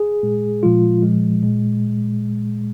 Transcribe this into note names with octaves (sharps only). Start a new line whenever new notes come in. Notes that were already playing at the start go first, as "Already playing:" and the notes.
Already playing: G#4
A#2 G#3
A#2 F3 G#3 F4
A#2 F3 G#3
A#2 G#3